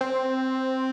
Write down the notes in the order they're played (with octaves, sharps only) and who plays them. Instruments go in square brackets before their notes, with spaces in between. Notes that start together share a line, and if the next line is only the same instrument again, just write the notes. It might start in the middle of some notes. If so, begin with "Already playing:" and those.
[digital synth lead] C4